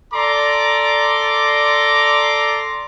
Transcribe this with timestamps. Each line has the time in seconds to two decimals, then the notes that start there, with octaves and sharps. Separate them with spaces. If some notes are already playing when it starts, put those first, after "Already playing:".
0.14 A4 D5 A#5 C6 D6